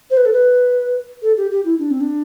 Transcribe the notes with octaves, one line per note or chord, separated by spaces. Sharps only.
C5
B4
A4
B4
A4
G4
G4
E4
D4
C4
D4